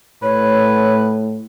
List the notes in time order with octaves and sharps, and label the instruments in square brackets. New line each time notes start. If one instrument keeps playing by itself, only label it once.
[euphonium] A2 [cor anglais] B4 [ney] C#5